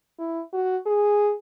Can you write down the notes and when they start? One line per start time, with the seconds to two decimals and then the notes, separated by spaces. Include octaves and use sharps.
0.19 E4
0.53 F#4
0.86 G#4